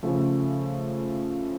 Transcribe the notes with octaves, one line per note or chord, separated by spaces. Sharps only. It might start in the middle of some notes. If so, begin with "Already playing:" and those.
C#3 F3 A3